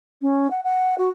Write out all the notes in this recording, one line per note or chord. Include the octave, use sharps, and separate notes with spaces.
C#4
F#5
F#5
F#4